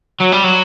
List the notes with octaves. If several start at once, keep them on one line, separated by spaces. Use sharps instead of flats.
F#3
G3
F#3